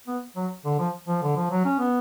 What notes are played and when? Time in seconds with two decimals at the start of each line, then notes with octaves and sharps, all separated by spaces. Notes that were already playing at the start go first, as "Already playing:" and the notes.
0.07 B3
0.36 F#3
0.65 D3
0.79 F3
1.08 F3
1.23 D3
1.36 F3
1.51 F#3
1.65 C#4
1.79 B3